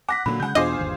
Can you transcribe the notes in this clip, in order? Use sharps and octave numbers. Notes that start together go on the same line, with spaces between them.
F#5 D6 A#6 B6
A#2 D3 F#3 A3 A#3 B5
C#3 G#3 F#5 G6
E2 B2 D4 F4 G#4 C5 D#5 D6
G1 D#2